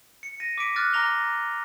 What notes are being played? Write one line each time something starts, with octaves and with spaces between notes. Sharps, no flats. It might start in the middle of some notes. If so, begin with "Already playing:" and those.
C#7
A#6 D#7
D6 B6 D7
D6 F6 F#6 A6
A#5 D6 A#6 F7 G7